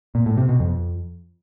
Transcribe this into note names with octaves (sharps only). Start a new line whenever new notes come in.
A#2
A2
C3
B2
F2